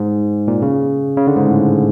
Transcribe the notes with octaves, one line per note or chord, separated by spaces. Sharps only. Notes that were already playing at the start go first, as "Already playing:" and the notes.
Already playing: G#2
A#2
C#3
C#3
D3
G#2
A2